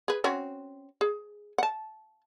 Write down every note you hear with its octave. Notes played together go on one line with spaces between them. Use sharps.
G#4 B4
C4 C#4 F#4
G#4
F#5 A5